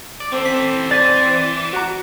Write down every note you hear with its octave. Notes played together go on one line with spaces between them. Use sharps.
D5
E3 C4 A4
B6
E3 D5 A6 D#7
F#4 F#5 A#5